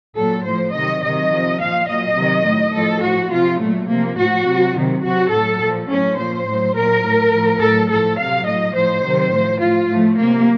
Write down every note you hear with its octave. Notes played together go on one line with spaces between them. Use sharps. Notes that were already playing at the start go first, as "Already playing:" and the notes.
A#2 F#3 A4
A2 F3 C5
C3 D#3 F#3 D#5
C3 D#3 F#3 D#5
C3 F3
A#2 F3 F5
A#2 F#3 D#5
C3 D#3 F#3
A2 F#3
A2 F3 A4
A2 F3 F#4
C3 F3 F4
A#2 F#3 A3
C3 F3 A#3
A2 F3 F#4
C3 F#3
C3 D#3 F#3
C3 F#3 F#4
A2 F#3 A4
A#2 F3
A2 F#3 C#4
A#2 F3 C5
A2 F#3
A#2 F#3 A#4
A2 F#3
A2 F3
A2 F#3 A4
A2 F3 A4
C3 F#3 F5
A2 D#5
F#3
A2 F3 C5
C3 D#3 F#3
A2 F3
A2 F3 F4
A2 F3 A3
C3 F#3 A#3